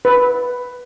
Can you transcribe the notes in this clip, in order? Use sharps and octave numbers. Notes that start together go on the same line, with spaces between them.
B4